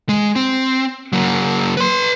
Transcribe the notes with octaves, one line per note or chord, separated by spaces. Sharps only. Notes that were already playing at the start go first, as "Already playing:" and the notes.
G#3
C4
F#3 A#3
B4 C6